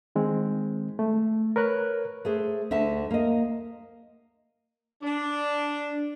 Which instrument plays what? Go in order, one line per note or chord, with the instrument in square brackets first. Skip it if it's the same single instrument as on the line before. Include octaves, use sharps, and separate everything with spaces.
[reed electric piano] D#3 G#3 C4
A3
A#4 B4 C#5 F#6
[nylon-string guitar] A3 G#4 C5
D2 D3 E5 A5
A#3 D#5
[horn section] D4